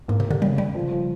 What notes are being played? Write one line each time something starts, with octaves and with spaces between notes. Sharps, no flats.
G#2 A#3
C3
G4
D3
C#3 G3
C#3 G3
F3
F3